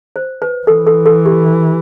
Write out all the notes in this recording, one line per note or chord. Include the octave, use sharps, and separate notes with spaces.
C5
B4
E3 A4
A4
A4
G4